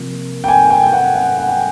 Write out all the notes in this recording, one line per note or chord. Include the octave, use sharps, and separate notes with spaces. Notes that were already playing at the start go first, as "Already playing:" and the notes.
Already playing: C3 F3 A#3
G5
G#5
G5
G5
F#5
F#5
F#5
G5